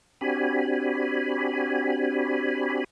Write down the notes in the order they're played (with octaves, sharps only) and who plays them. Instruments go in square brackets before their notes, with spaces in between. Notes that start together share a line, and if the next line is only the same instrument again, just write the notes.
[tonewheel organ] C4 D4 F#4 G4 G#5 B5